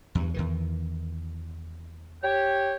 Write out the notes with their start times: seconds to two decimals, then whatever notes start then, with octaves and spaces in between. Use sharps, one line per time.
0.15 E2 G2
0.34 E2 D#3 E3
2.23 G4 C#5 G5